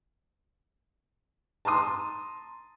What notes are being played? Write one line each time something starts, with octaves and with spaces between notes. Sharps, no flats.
A5 A#5 C6 D#6